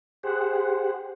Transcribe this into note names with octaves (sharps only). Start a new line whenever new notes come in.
G4 G#4 C5 F#5